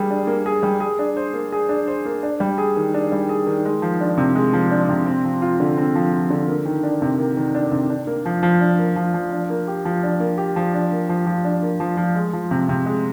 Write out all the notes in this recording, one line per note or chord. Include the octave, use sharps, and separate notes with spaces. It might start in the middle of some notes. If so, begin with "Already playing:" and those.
Already playing: G3 A#3 D4 G#4
D4
A#3
G#4
G3
G#4
D4
C5
A#3
G#4
D4
C5
A#3
D4
G3
G#4
D#3
D4
G3
G#4
D#3
G#3
F3
D4
C3
G#3
F3
D4
C3
C4
F3
F4
D3
C4
F3
F4
D3
A#3
D#3
D4
C3
A#3
D#3
D4
C3
D4
A#3
F3
F3
D4
A#3
F3
F3
D4
A#3
G4
F3
D4
A#3
G4
F3
D4
A#3
F3
F3
D4
A#3
F3
F3
G#3
F3
C3
C3
G#3